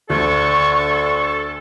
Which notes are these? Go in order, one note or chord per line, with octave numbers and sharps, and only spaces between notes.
D2 D3 A4 C#6